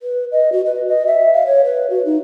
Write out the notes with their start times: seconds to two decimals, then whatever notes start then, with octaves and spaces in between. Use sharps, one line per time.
0.02 B4
0.32 D#5
0.52 F#4
0.66 B4
0.88 D#5
1.06 E5
1.33 F5
1.46 C#5
1.64 B4
1.90 F#4
2.05 D#4